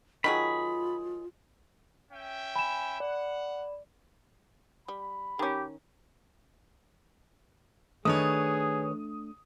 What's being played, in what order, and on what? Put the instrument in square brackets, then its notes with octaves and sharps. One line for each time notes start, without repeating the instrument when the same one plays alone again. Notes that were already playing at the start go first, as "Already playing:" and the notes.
[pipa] D#3 F#3 G#4 [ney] F4 [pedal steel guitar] B5
[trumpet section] C#4 E5 G5
[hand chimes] G#5 [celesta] B5 E7
[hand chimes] D5 [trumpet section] F#5
[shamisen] G3 [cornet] B5
[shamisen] D#3 C#4 [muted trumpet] G4
[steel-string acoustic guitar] D#3 B4 C#5 [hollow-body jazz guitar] A3 D4 [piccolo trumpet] G#4 [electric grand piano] D#6